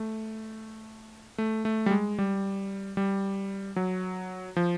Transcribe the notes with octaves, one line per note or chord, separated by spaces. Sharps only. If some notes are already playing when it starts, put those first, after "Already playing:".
Already playing: A3
A3
A3
G3
G#3
G3
G3
F#3
F3